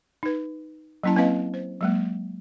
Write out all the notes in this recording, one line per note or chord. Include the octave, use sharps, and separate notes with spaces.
D#4 B4
F#3 A#3 C#4 E4 A5
A#3 C4 E4 B4 D#5 F5
C5
F#3 G#3 A#3